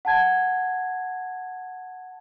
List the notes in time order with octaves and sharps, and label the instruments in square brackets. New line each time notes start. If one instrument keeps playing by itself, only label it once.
[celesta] F#5 A5 G#6